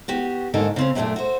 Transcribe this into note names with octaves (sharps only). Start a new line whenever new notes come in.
B3 F#4 G4
G#2 D3 D#3 A#3 A4 G#5
C#3 C4 C#4
F#2 A#2 F#3 G#3 A3 D4
F#4 C5